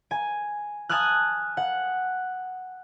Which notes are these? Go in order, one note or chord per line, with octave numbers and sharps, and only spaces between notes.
G#5
G#5 A5 D#6 F6 F#6
F#5